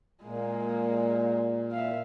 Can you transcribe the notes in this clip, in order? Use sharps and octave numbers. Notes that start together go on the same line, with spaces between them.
A#2 G#3 A#3
E5 F5